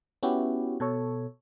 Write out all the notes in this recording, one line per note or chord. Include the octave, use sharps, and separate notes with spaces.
B3 C#4 E4 F#4 G4
B2 A4 C#5